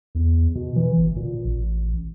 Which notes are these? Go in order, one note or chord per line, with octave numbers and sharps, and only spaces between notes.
E2
B2
E3
G1
A#2
A1